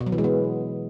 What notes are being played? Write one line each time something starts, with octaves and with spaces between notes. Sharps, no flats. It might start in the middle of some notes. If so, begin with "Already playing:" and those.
B2
F#3
E3
G#3
B3